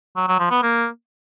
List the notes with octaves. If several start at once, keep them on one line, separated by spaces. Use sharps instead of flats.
F#3
F#3
F3
B3
A#3